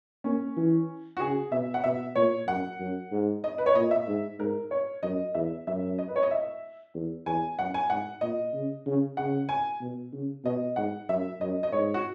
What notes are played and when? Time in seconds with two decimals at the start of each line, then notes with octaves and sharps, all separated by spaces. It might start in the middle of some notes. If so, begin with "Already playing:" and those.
0.24 A#3 C#4
0.56 E3
1.17 F#4
1.20 C#3 G#4
1.52 B2 E5
1.74 F#5
1.84 B2 E5
2.16 A#2 C#5
2.47 F#2 F#5
2.80 F#2
3.12 G#2
3.44 D#5
3.58 B4
3.66 C#5
3.75 A#2 D#5
3.91 E5
4.07 G#2
4.39 G#2 A#4
4.71 C#5
5.03 F#2 D#5
5.34 E2 E5
5.67 F#2 E5
5.99 D#5
6.08 B4
6.16 C#5
6.23 D#5
6.31 E5
6.94 E2
7.26 E2 G#5
7.58 F#2 F#5
7.74 G#5
7.90 G#2 F#5
8.21 A#2 D#5
8.54 C#3
8.86 C#3
9.17 C#3 F#5
9.49 G#5
9.81 B2
10.13 C#3
10.44 B2 D#5
10.76 G#2 F#5
11.09 F#2 E5
11.41 F#2 D#5
11.63 D#5
11.72 G#2 C#5
11.94 F#4